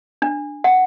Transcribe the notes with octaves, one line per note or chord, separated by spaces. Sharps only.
D4
F#5